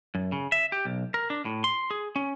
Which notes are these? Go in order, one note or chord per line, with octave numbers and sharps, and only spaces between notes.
F#2
C#3
E5
G4
B1
A#4
D4
A2
C6
G#4
C#4